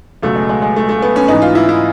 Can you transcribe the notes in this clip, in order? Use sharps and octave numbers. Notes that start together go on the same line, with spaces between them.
C#2 B2 F#3 A3
G#3
G#3
G#3
A3
A3
B3
C#4
G#2 E3 D#4
F4
E4
E4